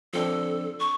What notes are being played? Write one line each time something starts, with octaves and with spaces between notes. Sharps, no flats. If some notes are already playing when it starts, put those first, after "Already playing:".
F3 C4 D4 A4
C#6